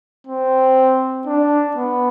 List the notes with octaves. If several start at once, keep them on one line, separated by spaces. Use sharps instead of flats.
C4
D4
B3